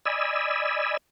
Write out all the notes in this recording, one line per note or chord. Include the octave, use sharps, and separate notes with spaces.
D5 D#5 G#5 B5 E6